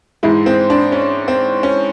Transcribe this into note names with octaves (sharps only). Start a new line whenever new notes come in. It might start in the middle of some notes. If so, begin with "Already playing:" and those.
G#2 E3 G#3 E4
C4
D4
C#4
C4
C#4